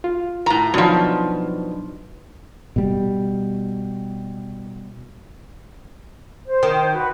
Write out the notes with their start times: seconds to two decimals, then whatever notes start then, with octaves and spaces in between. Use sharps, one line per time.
0.04 F4
0.46 A2 A#5
0.74 B2 F3 F#3 D4 D#4
2.76 B2 G3
6.47 C5
6.63 D#3
6.94 F#4 B4